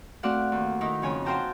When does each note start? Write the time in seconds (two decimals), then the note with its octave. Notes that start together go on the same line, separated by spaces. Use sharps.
0.23 A3 C4 F#4 D5 F5 F#5
0.52 D#2
0.81 D#3 D#4 E4
1.02 F2 C#3 C#5 G#5
1.25 F#4 C5 F5 G5 A5 A#5